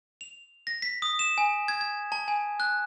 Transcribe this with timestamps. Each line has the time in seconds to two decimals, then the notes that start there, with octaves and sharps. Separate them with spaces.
0.21 F7
0.67 A#6
0.82 B6
1.02 D#6
1.19 E7
1.38 G#5
1.68 G#6
1.81 G#6
2.12 A5
2.28 G#5
2.60 F#6